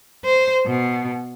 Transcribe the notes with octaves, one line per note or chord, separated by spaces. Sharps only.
C5
B2